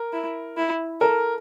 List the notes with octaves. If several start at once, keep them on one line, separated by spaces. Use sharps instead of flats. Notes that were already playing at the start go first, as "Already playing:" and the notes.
Already playing: A#4
E4
E4
A4 A#4